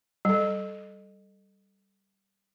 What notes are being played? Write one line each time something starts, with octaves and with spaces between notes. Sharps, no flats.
G3 A4